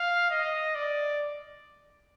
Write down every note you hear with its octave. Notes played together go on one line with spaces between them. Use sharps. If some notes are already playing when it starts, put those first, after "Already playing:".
Already playing: F5
D#5
D5